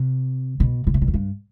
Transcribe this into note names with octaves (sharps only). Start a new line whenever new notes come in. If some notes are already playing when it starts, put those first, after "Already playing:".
Already playing: C3
B2
B2
C3
B2
F2
G2